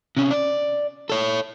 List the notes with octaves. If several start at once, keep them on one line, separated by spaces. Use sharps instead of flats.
C3 C#4
D5
A4 C#5